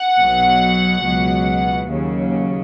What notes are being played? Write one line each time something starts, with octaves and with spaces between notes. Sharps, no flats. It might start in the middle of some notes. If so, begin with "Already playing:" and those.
Already playing: F#5
B1 B2 F#3
C#2 B2 F#3
D#2 C#3 F#3